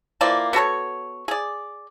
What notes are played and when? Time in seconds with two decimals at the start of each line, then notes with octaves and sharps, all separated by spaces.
0.21 E3 F3 A#3 D5
0.53 B3 F#4 A4 C#5
1.28 G#4 D5